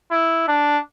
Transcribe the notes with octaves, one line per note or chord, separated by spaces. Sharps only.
E4
D4